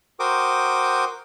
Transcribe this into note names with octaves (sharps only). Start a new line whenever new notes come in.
F#4 A#4 C5 G5 D6 D#6